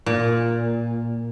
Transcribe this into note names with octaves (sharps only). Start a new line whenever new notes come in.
A#2